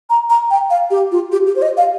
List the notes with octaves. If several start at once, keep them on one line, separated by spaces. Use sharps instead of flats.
A#5
A#5
G5
F5
G4
F4
G4
G4
C5
D#5
F5